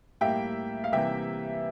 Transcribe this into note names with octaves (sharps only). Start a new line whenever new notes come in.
A2 G3 A#3 E5 G5
F5
C3 E3 G3 A#3 E5 G5